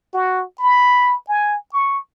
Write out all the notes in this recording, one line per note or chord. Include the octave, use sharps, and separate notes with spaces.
F#4
B5
G#5
C#6